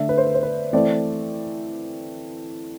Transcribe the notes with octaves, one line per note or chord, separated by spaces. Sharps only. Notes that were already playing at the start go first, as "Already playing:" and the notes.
Already playing: D3 A3 D4 E5
B4
C5
B4
C5
B4
E3 A3 C4 D5